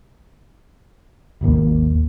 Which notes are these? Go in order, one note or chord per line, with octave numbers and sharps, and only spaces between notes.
D#1 G#1 D#2 A#3